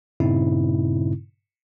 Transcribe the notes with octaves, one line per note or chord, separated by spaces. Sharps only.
G2 A#2 C#3 C4 D#4 E4